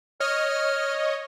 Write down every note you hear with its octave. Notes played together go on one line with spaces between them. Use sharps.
C#5 D#5 F6